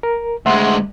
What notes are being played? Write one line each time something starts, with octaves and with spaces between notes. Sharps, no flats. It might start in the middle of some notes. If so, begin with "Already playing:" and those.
A#4
D2 G#3 E5 F#5 C6